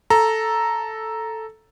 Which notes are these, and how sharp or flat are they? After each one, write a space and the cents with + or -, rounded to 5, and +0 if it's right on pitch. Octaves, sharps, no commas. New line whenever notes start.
A4 +0 A#5 +0